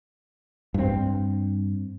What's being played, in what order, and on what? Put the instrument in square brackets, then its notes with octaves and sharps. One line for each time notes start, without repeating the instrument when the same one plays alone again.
[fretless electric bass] G2 C4